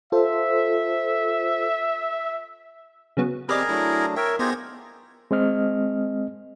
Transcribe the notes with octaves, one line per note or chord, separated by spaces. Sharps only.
F4 A4 C5 E5
C#3 F#3 B3
C4 G4 G#4 A#4 B4 D5 D#5 A#5
F#3 A3 D4 E4
A#4 C#5 E5 G5
B3 D#4 F4 G4 G#4 C5 G#6 A#6
G#3 C4 D#5 F6